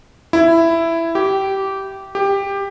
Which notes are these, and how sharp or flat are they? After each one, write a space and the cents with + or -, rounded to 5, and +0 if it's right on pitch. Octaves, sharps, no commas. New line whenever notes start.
E4 +10
G4 -15
G4 +15